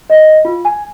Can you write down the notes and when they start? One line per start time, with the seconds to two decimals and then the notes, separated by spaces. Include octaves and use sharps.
0.10 D#5
0.45 F4
0.65 G#5